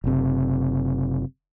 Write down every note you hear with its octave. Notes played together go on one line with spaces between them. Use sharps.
F#1 C3